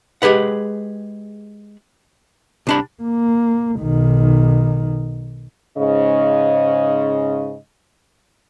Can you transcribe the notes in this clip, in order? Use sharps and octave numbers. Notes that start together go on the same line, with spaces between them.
G#3 G4 G#4 B4 F#5
C2 D4 B5
A#3
B1 D#3
G#2 C#3 D#5